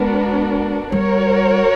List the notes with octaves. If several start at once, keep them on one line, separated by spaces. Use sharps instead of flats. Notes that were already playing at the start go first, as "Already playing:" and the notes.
Already playing: G#3 B3 D4 F#4 A#4
G3 F#4 A#4 C#5